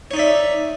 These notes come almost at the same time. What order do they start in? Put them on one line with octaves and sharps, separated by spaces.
C#5 D#4 D5 E5